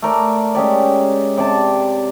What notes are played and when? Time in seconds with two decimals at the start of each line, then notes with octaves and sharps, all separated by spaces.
0.02 A3 A#4 D5
0.55 G#3 C#4 G4 D5
1.38 C3 D5 A5